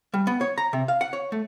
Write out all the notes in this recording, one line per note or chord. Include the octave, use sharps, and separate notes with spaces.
G3
B3
C#5
A#5
C3
F5
F#5
C#5
A3